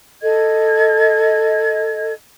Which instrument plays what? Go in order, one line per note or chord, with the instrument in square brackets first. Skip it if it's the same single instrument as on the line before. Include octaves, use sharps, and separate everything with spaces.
[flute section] A4 D#5 G#6